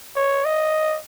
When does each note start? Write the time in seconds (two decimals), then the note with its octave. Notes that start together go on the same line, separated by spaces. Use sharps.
0.16 C#5
0.45 D#5